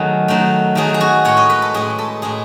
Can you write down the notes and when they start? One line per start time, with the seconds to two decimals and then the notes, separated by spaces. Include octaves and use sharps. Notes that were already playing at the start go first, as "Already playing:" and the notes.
Already playing: D#3 F#3 A3 G#4
0.28 D#3 F#3 A3
0.75 D#3 F#3 A3 G#4
0.94 G#4
1.01 F#4
1.25 A2 G#3 C#5
1.37 D#5
1.50 B4
1.62 A4
1.74 A2 G#3 G#4
1.98 A4
2.22 A2 G#3 G#4